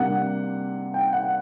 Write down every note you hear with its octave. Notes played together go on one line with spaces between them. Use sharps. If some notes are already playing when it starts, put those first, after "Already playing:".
Already playing: C3 G3 A#3 D4 F#5
G5
F#5